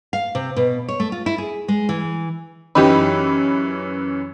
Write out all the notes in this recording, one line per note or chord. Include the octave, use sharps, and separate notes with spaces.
F5
C3
B2
C#5
A3
F4
E4
G#4
G#3
E3
F#2 E3 D#4 G4 B5